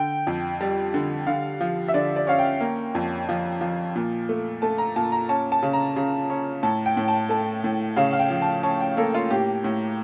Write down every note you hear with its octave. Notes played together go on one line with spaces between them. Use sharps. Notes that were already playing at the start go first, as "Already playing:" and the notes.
Already playing: D3 G5
F2
G3
D3
D3 F5
F3
E5
D3 D5
D5
C#4 F5
G5
A#3
F2
F3
F3
A#2
A3
A3 A5
A#5
A#2 A5
A#5
C#4 A5
A5
C#3
A#5
C#3
C#4
A2 A5
G5
A2
A5
A3 A5
A2
C#3 F5
F5
G5
F3
A5
C#4 A5
G5
A#3 A4
F4
A2 G4
A2